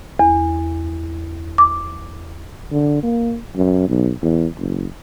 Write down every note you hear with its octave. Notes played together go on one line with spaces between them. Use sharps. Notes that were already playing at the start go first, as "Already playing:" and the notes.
E2
D6
D3
A#3
F#2
B1
E2
F#1